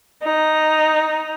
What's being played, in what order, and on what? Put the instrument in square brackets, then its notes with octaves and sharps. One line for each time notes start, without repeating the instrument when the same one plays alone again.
[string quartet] D#4